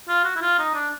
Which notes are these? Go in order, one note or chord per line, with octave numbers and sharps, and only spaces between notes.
F4
F#4
E4
F4
D#4
D4